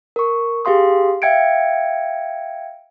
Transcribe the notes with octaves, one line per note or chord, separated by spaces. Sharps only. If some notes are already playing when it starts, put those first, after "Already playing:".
A#4 C#6
G4 G#4 F5 C6 D#6
E5 F5 G5 G#6 C#7 D7